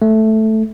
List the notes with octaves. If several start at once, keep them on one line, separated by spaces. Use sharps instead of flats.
A3